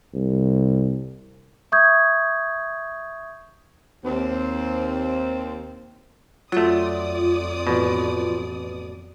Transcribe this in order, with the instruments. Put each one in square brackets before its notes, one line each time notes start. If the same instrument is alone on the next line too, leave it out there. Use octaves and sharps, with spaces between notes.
[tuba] C2
[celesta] E5 C#6 D#6 G6 G#6
[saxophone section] D#2 C4
[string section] F2 D5 D#6 [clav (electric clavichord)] F#3 A3 [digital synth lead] F4
[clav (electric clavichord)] A1 B2